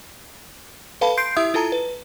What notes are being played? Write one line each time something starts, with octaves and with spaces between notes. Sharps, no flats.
A4 B4 F5 A5 B5
C6 G6 C7 D7
E4 G4 E5 D#6 E6
E4 F4 A4 A5 A#5
B4